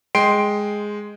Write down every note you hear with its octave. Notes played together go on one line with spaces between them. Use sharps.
G#3 G5 C6 C7 D7